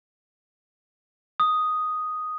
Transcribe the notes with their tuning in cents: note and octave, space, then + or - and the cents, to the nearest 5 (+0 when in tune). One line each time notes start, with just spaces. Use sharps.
D#6 +0